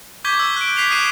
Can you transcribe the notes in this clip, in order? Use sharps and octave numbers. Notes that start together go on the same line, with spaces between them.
C#6 D6 G6 G#6 B6 G7
E6
F#6 D7
F#6 B6 C7 F7 G7
D#6 F#6 C7 D#7 E7